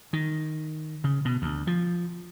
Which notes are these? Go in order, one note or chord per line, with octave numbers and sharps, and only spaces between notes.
D#3
C#3
B2
D2
F3